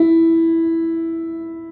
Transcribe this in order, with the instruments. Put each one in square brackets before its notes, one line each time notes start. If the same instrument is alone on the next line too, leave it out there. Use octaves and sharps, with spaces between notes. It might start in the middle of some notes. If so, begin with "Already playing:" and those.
Already playing: [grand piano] E4